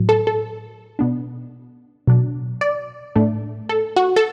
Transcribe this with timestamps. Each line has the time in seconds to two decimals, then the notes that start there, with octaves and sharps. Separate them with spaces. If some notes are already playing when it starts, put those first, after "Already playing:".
Already playing: A2 F#3
0.09 A4
0.27 A4
0.99 B2 B3 D4
2.07 B2 F#3 D4
2.61 D5
3.15 A2 A3 D4
3.69 A4
3.96 F#4
4.16 A4